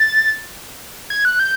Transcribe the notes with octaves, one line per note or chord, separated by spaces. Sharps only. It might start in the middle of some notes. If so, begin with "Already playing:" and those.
Already playing: A6
G#6
F#6
G6